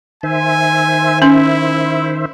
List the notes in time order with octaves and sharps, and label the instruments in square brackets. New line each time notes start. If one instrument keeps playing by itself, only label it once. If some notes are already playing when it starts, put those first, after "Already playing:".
[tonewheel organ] D#3 C5 E5 [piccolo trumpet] G#5
[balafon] C#4 C6 [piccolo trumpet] E4